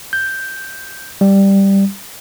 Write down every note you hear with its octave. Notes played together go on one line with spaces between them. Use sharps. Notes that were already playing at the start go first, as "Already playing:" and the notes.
G6
G3